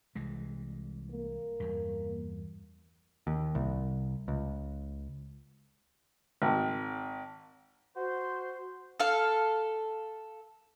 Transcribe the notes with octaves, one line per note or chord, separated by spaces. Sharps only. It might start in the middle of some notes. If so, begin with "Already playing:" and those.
C2 E3 G#3
A#3
E2 G2
D#2
C2
C#2
G#1
F#4 C5
A4 F5